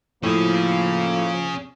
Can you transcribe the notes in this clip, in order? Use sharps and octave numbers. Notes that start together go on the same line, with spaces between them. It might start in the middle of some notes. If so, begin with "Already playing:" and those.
A2 F3 A#3 C#4 G#4